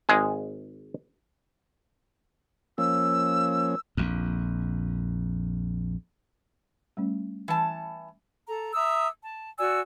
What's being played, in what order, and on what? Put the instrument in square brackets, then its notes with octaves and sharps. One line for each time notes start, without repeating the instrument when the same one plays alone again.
[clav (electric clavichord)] G#1 G#3 G#4
[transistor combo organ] F3 A#3 C#4 [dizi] E6
[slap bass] A#1 F2
[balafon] G3 A3 C#4
[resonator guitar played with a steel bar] E3 A5
[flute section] A4 A#5
E5 A#5 D#6 E6
A5
F#4 D5 G#5 E6